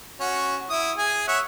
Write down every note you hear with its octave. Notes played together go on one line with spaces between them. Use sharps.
C#4 F#4
E4 D#6
G#4 G#5
C#5 E5 F#5